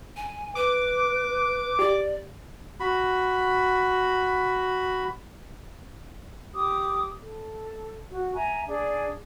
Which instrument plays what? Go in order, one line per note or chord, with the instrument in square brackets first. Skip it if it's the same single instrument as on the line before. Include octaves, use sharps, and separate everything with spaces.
[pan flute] G#5
[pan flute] B4 [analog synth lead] D6
[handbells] G4 [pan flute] D5
[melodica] F#4 B5
[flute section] G4 D6 D#6
A4
F#4
E5 G#5 A#5
D4 G#4 D5